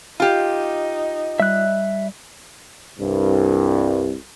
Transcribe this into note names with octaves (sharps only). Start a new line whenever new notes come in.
D#4 F4 G4
G3 E5 F#6
C2 G2